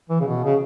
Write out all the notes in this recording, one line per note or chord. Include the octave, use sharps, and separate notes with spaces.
E3
C#3
B2
C#3